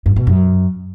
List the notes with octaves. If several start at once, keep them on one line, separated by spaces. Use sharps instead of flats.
G2
B2
F#2